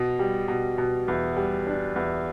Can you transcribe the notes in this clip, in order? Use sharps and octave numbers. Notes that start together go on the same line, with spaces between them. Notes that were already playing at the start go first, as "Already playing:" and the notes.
Already playing: B2
G3
B2
B2
E2
G3
D4
E2